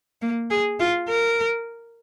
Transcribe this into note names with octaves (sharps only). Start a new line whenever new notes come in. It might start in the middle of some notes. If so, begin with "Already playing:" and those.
A#3
G#4
F4
A#4